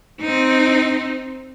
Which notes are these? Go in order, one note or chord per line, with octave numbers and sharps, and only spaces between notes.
C4 D#4